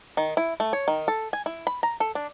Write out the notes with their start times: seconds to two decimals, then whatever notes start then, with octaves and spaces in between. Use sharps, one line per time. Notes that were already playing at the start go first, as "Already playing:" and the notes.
0.17 D#3
0.37 E4
0.60 A3
0.73 C#5
0.88 D#3
1.08 A4
1.33 G#5
1.46 E4
1.67 B5
1.83 A#5
2.00 A4
2.15 D4